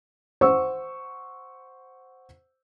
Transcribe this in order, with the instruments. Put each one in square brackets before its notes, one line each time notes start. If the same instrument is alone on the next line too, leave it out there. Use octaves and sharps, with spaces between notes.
[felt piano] C5 F#5 C#6 E6